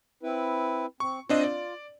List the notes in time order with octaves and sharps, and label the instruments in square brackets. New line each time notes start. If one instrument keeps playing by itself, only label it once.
[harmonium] C4 E4 B4
[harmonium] C4 [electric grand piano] C#6
[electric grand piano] C4 D4 D#5 [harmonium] F4
[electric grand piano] D5